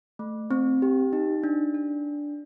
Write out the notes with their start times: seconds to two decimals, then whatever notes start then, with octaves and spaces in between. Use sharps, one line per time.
0.19 A3
0.51 C4
0.82 G4
1.13 D#4
1.43 D4
1.74 D4